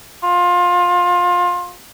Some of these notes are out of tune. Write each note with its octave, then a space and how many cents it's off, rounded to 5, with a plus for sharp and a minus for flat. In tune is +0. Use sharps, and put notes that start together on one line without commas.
F4 +25